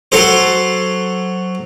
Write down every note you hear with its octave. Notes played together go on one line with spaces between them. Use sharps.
F#3 A4 C5